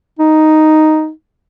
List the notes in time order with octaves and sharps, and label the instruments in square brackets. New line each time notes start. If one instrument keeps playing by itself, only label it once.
[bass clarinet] D#4